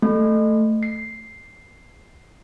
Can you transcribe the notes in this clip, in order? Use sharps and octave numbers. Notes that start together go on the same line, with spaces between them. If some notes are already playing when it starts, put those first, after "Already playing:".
A3
C7